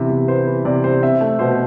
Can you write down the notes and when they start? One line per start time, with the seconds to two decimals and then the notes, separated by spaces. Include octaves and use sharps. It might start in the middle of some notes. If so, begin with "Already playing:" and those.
Already playing: C3 E3 B3 E5
0.10 C3
0.28 B3 C5
0.47 E3
0.65 C3 D5
0.84 C3 C5
1.02 C4 E5
1.21 A3
1.39 B2 C5